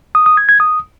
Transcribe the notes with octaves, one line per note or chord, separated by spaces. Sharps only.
D#6
D#6
G#6
G#6
D#6